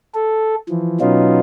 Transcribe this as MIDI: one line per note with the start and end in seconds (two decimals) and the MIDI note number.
0.14 0.55 69
0.69 0.98 52
0.69 0.98 53
1.01 1.40 47
1.01 1.40 54
1.01 1.40 59
1.01 1.40 61
1.01 1.40 63
1.01 1.40 65